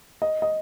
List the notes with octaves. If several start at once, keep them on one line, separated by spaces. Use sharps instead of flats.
D#5
D#5